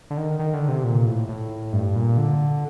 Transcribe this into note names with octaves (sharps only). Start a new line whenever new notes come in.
D3
D#3
D#3
D3
C3
A#2
A2
A2
G2
A#2
D3